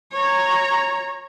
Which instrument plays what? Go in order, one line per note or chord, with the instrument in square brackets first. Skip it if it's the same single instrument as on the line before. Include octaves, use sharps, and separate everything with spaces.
[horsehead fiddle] C#5 A#5